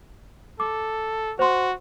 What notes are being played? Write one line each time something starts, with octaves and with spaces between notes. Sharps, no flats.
A4 D6
F#4 C5 C6